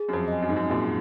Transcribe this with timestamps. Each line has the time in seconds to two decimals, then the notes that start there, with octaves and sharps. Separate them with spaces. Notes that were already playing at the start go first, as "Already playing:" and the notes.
Already playing: G#4
0.09 F#2
0.13 F2
0.28 D#5 G#5
0.42 F#2
0.49 G#2
0.56 F#2
0.70 F#2 A#2 G#4